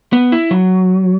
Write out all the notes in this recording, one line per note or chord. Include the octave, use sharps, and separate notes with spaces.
B3
E4
F#3